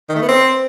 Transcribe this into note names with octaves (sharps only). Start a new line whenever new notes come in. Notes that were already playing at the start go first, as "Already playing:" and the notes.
D#3
A3
B3
C4